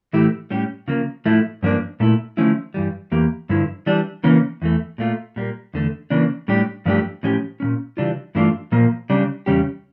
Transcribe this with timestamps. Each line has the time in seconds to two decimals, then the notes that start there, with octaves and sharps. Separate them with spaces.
0.13 A2 E3 A3 E4 G4
0.50 A2 G3 C#4 G4
0.88 C#3 F3 A#3
1.25 A2 F3 A3 E4
1.63 G2 F3 A#3 D4
2.00 A#2 A3 E4
2.37 D3 F3 A3 C#4 E4
2.74 G2 E3 G3
3.12 E2 E3 A#3 G4
3.49 G2 D3 F3 E4
3.86 E3 G3 D4
4.24 C#3 E3 A#3 C#4
4.62 E2 E3 A3
4.98 A#2 A3 D4 F4
5.36 A#2 G3 A#3
5.74 E2 D3 A3
6.10 C#3 E3 A#3 D4
6.48 A2 G3 D4 G4
6.86 G2 F3 A3 D4 G4
7.23 A2 F3 C#4 G4
7.60 A#2 G3 C#4
7.97 C#3 E3 G3 D4 F4
8.35 G2 E3 A3 D4 F4
8.72 A#2 F3 A#3
9.10 C#3 G3 D4
9.46 E2 C#3 G3 C#4 G4